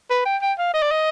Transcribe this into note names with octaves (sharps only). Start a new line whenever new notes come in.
B4
G5
G5
F5
D#5
D5
D#5